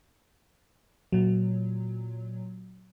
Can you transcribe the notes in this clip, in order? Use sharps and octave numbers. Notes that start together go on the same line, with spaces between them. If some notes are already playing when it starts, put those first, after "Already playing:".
A#2 F#3